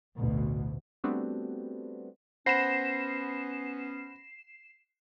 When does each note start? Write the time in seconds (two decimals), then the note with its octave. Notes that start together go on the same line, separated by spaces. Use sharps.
0.17 A1 D2 B2
1.04 G3 A3 B3 C4 D4 F#4
2.46 B3 C#4 C5 F#5 B5 A#6 C7 E7